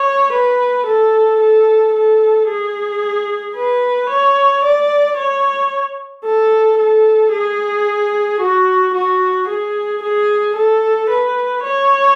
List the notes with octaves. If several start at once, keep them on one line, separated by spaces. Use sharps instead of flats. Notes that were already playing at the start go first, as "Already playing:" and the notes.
Already playing: C#5
B4
A4
A4
A4
G#4
B4
C#5
D5
C#5
A4
A4
G#4
F#4
F#4
G#4
G#4
A4
B4
C#5